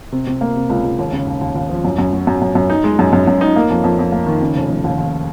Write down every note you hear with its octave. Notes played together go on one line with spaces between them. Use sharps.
C3
C3
A#3
C3
C#2
C#2
D#2
C#3
D#2
D#2
D#2
F3
F#2
F#2
F#3
F#2
F#2
F#2
D#4
G#3
F#2
F#2
F#2
D#4
A#3
F2
F2
F2
A#3
D#3
C#3
F1
F1
D#2
D#2